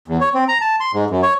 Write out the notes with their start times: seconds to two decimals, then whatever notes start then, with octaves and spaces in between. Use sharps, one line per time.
0.08 E2
0.21 C#5
0.34 C4
0.48 A#5
0.61 A5
0.80 C6
0.93 G#2
1.10 F#2
1.23 C#5